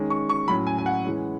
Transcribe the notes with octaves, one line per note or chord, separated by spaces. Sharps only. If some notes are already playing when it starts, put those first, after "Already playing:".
Already playing: D#3 G#3 C#4
C#6
C#6
A2 F#3 C#4 B5
G#5
G#5
F#5
E3 G#3 C#4